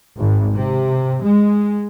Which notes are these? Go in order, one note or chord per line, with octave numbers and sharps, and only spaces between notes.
G#1
C3
G#3